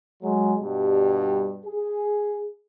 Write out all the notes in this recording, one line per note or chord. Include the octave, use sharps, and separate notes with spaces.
F#3 G#3
G2 B2 G3
G#4